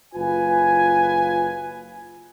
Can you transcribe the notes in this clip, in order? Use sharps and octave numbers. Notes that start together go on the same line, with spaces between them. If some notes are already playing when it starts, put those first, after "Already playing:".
F#1 F4 B4 G#5